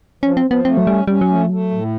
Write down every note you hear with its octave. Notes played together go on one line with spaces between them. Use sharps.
F3 C#4
C4
F3
B3
A3 C4
F#3
G3 C#4
G3 C#4
F#3
A3
F3
F#3 A3
A2